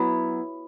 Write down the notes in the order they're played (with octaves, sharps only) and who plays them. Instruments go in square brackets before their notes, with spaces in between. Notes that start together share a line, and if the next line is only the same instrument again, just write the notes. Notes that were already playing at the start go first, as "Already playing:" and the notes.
Already playing: [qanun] F#3 B3 E4